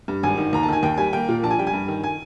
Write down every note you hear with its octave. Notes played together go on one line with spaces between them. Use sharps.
G2
G#1 G#5
D#3
D#2 A#5
A5
D#3 G#5
D#2 G5
G3 G#5
A#3 G5
A#2
A#1 A5
G#5
G3 G5
G#5
G2
D#3
G#5